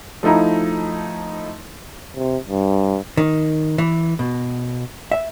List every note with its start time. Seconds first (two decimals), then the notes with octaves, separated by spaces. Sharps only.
0.23 F3 A3 D#4 E4 A#5
2.16 C3
2.49 G2
3.17 D#3
3.78 E3
4.19 B2
5.12 E5